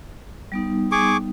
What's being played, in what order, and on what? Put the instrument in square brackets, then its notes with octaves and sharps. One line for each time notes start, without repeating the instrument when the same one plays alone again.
[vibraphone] G3 B3 D#4
[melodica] G#4 C#6 D6